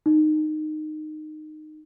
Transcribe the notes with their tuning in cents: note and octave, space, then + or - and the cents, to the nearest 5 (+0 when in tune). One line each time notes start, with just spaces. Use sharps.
D#4 -15